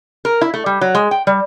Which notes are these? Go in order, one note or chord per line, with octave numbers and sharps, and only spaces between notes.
A#4
E4
A3
G3
F#3
G#3
G5
G3